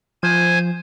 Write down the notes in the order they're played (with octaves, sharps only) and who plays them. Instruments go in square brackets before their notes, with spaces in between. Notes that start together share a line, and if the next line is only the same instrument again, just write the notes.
[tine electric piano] F3 [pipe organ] C5 G#5 G#6